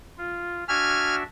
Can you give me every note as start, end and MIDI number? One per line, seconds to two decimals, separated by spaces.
0.18 0.64 65
0.68 1.23 62
0.68 1.23 66
0.68 1.23 76
0.68 1.15 80
0.68 1.15 89